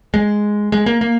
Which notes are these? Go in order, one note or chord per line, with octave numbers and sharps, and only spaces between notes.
G#3
G#3
A#3
A#3